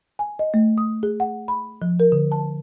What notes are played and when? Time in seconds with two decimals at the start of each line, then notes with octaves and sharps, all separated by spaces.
0.19 G#5
0.39 D#5
0.54 A3
0.78 D#6
1.03 G#4
1.20 F#5
1.48 B5
1.82 F3
2.00 A#4
2.12 D3
2.32 A5